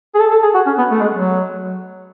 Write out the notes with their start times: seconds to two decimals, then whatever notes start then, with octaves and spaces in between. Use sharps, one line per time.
0.15 G#4
0.19 A4
0.31 A4
0.43 G#4
0.54 F#4
0.66 C#4
0.78 B3
0.91 A3
1.01 G#3
1.13 F#3